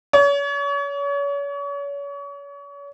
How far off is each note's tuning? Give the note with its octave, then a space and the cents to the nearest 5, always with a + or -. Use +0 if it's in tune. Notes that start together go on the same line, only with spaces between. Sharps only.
C#5 +35